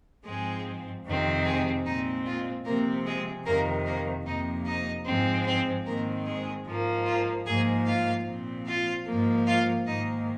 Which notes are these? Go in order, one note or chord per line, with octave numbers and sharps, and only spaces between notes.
G#2 F3 G#3 C4 G#4
F2 C3 D#3 C4
G#3 G#4
A#2 G#3 C4 D#4
F4
C3 F3 A#3 C4 A#4
G#3 G#4
F2 C3 D#3 A#3 A#4
A#3 A#4
F2 C3 F3 A#3 D#4 D#5
D#4 D#5
G#2 F3 G#3 C4
C4 C5
G#2 D#3 G#3 A#3 C4 A#4
G#3 G#4
G#2 F3 A#3
F4
G#2 F3 A#3 G#4 G#5
F4 F5
A#2 F3 C4
F4 F5
G#2 F3 A#3
F4 F5
G#2 D#3 A#3 D#4 D#5